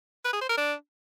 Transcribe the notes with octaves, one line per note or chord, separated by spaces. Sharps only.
B4
G#4
C5
A#4
D4